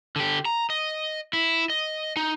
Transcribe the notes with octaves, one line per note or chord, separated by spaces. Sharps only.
D3 G4
A#5
D#5
E4
D#5
D#4